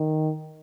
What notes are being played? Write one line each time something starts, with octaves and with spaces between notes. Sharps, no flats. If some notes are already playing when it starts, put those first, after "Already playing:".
Already playing: D#3